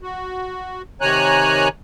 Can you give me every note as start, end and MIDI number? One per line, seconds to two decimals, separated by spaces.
0.01 0.82 66
1.01 1.68 48
1.01 1.68 51
1.01 1.68 73
1.01 1.68 80
1.01 1.68 82
1.01 1.68 90